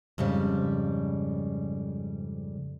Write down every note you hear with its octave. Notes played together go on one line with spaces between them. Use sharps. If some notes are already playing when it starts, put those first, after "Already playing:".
F2 G#2 C#3 G3